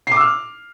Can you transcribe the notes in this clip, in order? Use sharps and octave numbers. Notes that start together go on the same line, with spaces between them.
D6 E6 F6 C7